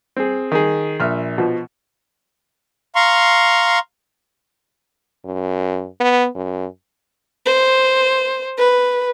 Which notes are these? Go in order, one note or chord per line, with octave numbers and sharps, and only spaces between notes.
C4 G#4
D#3 G#4
A#1 E5 F6
B2 F3
F5 A#5 C6 C#6
F#2
B3
F#2
C5
B4